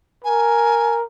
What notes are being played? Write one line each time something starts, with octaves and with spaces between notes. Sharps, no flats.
A#4 G#5